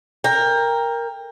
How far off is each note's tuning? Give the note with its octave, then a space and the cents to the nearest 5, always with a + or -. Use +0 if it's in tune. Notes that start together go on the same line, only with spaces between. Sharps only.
A#4 +0 G5 +25